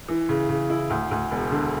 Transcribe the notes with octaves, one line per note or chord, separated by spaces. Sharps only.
E3
C#3
C#3
E4
D2
D2
E1
D3